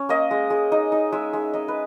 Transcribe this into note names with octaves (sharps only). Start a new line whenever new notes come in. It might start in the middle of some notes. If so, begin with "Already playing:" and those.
Already playing: C#4
A#3 D#5
G#3
G#3
D#4 D#5
D#4
G#3 E5
G#3
D#4 D#5
B4